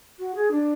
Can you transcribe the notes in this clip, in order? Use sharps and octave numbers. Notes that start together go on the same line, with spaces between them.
F#4
G#4
D4